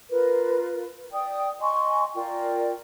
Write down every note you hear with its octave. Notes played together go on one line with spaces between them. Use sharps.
F4 A#4 B4
D5 G5 D#6
D#5 G#5 C6 C#6
F4 A#4 D5 G5